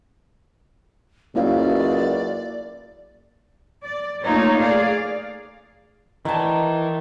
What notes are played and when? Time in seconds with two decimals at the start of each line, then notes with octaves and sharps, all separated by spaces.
1.35 C#2 F#2 A#3 E4 D5 F5
3.83 D5
4.24 A3 A#3 D#4 F4 C#5
4.58 G#4 D5 F5
6.25 D#3 E3 A5